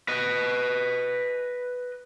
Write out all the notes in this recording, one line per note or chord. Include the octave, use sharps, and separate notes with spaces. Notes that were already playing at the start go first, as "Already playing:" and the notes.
B4 D#5